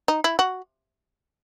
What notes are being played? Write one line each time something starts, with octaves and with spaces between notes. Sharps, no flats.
D#4
E4
F#4